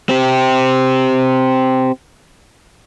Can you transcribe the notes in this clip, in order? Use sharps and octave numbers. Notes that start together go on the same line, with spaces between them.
C4 G4